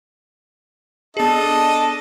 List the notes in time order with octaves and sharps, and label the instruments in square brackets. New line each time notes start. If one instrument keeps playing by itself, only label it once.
[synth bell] B3 G#4 [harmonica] D4 A4 [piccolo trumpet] D#5